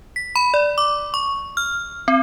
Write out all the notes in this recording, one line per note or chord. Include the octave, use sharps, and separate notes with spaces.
B6
B5
D5
D6
C#6
F6
C4